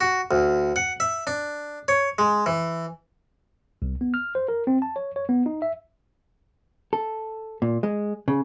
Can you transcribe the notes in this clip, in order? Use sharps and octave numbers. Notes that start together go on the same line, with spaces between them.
F#4
D2
F#5
E5
D4
C#5
G#3
E3
C2
B3
F6
C5
A#4
C4
A5
C#5
C#5
B3
D#4
E5
A4
A#2
G#3
C#3